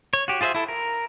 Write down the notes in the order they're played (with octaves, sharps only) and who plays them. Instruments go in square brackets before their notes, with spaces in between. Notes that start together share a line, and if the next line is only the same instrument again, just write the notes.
[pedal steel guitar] C#5
F#4 G4
F4 G#4 C5 D#5 E5
E4 A4
A#4